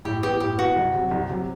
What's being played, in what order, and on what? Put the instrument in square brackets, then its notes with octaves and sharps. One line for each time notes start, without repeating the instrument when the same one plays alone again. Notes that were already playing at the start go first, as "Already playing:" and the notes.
[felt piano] A2 [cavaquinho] G4
[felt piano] E3 B3 [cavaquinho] G4
[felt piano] A2 [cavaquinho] G4
[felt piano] E3 B3 [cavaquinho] F#4
[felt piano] C2
C3 F#3
C2
C3 F#3